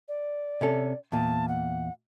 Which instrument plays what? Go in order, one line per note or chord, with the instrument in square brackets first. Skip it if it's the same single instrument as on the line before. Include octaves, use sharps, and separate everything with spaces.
[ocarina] D5
[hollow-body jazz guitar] C3 C#4 A4
[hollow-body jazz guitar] E2 A#2 [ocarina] A5
[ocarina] F#5